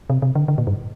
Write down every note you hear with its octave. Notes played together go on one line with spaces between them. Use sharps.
C3
C3
D3
D3
A#2
G2